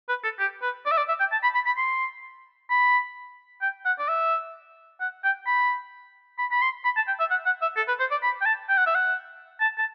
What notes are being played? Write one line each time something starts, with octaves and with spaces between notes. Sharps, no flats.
B4
A4
G4
B4
D5
E5
D5
E5
G5
A5
B5
B5
B5
C6
B5
G5
F#5
D5
E5
F#5
G5
B5
B5
B5
C6
B5
A5
G5
E5
F#5
F#5
E5
A4
B4
C5
D5
B5
G5
A5
G5
F#5
E5
F#5
A5
A5